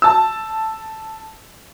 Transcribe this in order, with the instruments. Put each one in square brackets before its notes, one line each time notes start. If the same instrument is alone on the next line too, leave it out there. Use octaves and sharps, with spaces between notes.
[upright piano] A5 E6